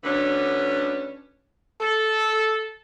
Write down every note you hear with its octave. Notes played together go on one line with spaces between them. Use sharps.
D2 D3 C#4 D4 B4
A4